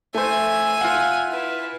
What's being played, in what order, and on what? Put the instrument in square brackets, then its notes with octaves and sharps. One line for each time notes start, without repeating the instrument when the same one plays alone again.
[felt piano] A3 C5 [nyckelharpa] E5 [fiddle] G#5
[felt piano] F4 F5 F#5
[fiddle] E4 B4